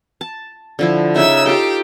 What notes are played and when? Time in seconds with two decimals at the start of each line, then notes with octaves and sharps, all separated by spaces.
0.21 A5
0.79 D3 F3 E4
1.16 C#3 D#4 E5 E6
1.46 F4 G4 A4 C5